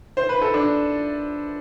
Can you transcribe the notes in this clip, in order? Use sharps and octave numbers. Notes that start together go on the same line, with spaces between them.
C5
B4
A4
D4